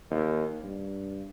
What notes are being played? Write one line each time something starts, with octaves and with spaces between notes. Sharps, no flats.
D#2
G2